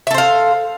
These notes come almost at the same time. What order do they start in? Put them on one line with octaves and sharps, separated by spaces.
E5 A4 C5 F5